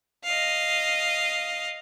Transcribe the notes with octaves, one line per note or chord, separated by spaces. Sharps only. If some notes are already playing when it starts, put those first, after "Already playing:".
D#5 F5